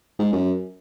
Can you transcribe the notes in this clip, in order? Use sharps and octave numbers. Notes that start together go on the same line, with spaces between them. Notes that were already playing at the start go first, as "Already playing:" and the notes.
G#2
F#2